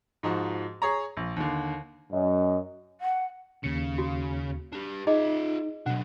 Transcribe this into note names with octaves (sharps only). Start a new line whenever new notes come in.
G#2 F3 D#4 F#4
G#4 C#5 A#5
A#1
D#2 D3
F#2 D#5
F#5
D#2 C#3 C#7
F#4
D4 G4
D#4 F4 G#4 D#5 E5
B2 F#3 D4 F#5